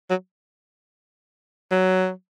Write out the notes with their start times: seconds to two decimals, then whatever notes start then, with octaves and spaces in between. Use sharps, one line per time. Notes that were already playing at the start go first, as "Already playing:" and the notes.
0.10 F#3
1.71 F#3